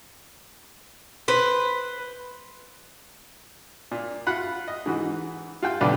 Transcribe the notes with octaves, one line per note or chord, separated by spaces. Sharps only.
B4 C5
A#2
F4 F#4 F#5 B5
D#5
G#2 E3 F#4
F4 F#4 G5
B1 D3 D4 G4 B4 D5